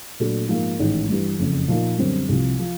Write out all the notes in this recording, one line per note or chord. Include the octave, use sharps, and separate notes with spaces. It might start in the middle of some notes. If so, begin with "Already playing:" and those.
A#2 F#3 A3 D4
G#2 F3 A#3
A1 G#2 D#3
G2 E3 G3
F#1 F2 C#3
A#2 F3 A#3 D#4
F#2 D3 G3 C4
C2 C3 F3
F3